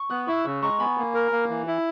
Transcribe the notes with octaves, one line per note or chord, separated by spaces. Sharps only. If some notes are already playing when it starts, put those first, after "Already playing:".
Already playing: C#6
B3 D#6 F#6
E4 C#6 E6
C#3 C#6 E6
G#3 A#5 C#6
B3 G#5 B5
A#3
A#4
A#3
E3
E4